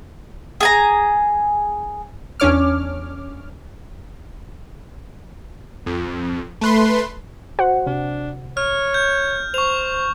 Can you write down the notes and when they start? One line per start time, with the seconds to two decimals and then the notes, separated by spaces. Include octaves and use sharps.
0.61 G#4 G#5 A#5
2.40 E2 C#4 D4 C#5 D6 F6
5.86 F2
6.61 A3 B4 C6
7.59 F#4 C5 F#5
7.86 C3 D4
8.57 C#5 F6
8.94 G6
9.54 C5 C#6 F7